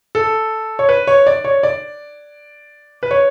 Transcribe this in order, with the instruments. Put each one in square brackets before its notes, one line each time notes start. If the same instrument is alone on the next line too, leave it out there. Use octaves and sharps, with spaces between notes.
[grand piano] A4
C#5
B4
C#5
D5
C#5
D5
B4
C#5